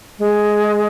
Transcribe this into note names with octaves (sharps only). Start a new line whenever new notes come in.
G#3